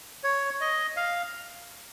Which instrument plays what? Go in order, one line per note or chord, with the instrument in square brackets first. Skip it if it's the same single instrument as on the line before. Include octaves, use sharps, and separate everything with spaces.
[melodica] C#5
D#5
F5